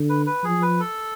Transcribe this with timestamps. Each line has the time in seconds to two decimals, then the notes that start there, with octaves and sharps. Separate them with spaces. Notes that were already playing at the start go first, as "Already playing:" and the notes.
Already playing: D3
0.09 B4
0.26 B4
0.43 F3 G#4
0.62 B4
0.80 A4